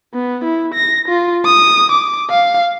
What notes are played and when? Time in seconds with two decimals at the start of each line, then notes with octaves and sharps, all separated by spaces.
0.14 B3
0.44 E4
0.74 A#6
1.08 F4
1.45 D#6
1.92 D6
2.30 F5